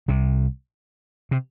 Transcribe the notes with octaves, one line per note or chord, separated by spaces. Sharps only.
C2 C3
C3